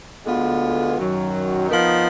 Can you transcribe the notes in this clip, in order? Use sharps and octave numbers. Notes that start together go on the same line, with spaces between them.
D2 D3 G#3 B3 F4
F#2 D#3 F#3
F3 B3 D#4 A#4